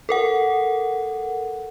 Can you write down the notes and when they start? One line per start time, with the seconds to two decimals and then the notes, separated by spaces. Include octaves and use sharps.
0.09 A4 A#4 F#5